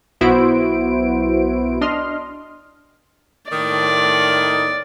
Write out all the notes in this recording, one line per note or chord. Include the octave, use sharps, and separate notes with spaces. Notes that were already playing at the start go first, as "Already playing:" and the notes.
B1 B3 E4 F#4 C5 D7
D4 D#5 C6 F6
A2 D#3 D5